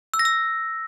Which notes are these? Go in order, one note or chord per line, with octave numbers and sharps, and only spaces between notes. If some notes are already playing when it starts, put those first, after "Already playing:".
E6
A#6
E6